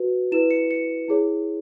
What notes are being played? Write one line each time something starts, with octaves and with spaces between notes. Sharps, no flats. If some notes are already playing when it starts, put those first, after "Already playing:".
Already playing: F#4 B4
E4 B4 E7
C#7
C#7
E4 G#4 C#5